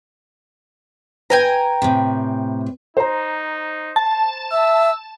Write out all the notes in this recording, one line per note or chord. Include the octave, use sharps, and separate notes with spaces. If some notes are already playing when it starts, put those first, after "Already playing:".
B4 G5 G#5 A#5
A2 C3
D#4 C5 A#5
A5
E5 E6